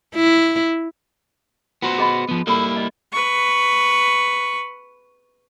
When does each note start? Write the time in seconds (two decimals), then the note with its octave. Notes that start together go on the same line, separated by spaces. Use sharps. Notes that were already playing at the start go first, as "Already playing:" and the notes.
0.15 E4
1.82 B3 F4 F#4 C5
1.98 G#4 D#5 B5
2.29 F3 B3
2.47 G3 A#3 E4 A4 B5
2.77 D#5
3.12 B4 C#6